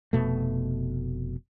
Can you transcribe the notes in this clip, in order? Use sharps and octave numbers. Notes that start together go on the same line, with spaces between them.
F1 B2 A3